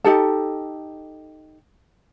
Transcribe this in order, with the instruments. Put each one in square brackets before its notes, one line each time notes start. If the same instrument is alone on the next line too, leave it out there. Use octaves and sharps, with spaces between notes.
[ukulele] D#4 G4 A4 A5